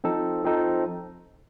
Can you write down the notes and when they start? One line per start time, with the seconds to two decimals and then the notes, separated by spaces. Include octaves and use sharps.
0.04 F3 C4 D#4 A4
0.44 F3 C4 D#4 A4